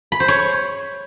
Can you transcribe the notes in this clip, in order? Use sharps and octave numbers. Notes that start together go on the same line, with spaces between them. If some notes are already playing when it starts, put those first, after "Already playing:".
B5
C5
C#5